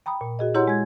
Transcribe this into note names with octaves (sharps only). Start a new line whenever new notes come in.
G5 A#5 B5 D#6
A#2
F#4 G#4 D#5
E4 G4 C#5 F#5 A#5 C6
G#3 G#6